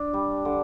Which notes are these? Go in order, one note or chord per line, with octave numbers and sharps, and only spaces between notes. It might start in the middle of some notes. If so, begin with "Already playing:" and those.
Already playing: D4
G3
D3